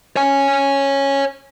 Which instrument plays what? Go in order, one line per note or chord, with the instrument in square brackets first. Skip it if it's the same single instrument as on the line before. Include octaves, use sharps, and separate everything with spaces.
[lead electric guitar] C#5 G#5